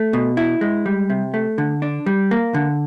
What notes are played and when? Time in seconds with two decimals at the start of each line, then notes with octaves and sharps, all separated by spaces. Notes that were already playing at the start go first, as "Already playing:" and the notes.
Already playing: A3
0.13 B2
0.37 E4
0.61 G#3
0.86 G3
1.10 C3
1.34 A3
1.58 D3
1.82 D4
2.06 G3
2.31 A#3
2.54 D3